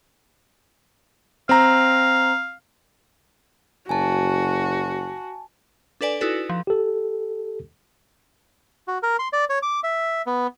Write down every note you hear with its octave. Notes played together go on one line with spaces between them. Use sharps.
C4 F5 A#5
F#1 F#4 G#5 A5
D4 A4 B4 D5 G#5
D#4 E4 F#4 A4 B4
F3
G4 A4
F#4
A#4
C6
D5
C#5
D6
E5
B3